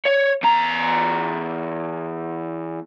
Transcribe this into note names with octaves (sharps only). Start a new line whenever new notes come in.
C#5
E2 A#5